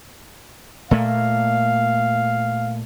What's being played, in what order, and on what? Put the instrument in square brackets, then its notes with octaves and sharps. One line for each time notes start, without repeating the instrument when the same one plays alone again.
[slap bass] A#2 A3 A#3 [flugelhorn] F5